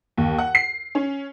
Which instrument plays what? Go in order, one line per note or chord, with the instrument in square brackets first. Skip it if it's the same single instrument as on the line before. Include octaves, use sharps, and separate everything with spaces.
[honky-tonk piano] D#2
F#5
C7
C#4